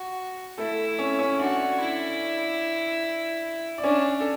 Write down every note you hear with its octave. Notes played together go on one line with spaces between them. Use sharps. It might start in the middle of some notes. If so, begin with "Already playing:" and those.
Already playing: F#4
A3 E4 A4
C#4 C#5
C#4 C#5
D4 F#4 D5
E4
D5
C#4 D4 C#5
A4